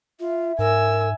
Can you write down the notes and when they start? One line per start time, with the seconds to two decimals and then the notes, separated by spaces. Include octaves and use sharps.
0.20 F4 E5
0.59 G#2 A#4 G#5 E6